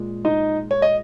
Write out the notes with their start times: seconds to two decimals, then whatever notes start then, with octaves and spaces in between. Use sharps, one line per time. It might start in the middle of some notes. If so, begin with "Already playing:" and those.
Already playing: A#2 G#3
0.25 D#4 D#5
0.71 C#5
0.82 D#5